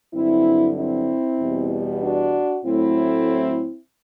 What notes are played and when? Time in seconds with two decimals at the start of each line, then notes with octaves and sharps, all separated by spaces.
0.14 G2 D3 F#3 C4 E4
0.77 C4 E4
1.40 E2 B2 G3
2.02 D4 F#4
2.65 A2 F#3 A3 C4 E4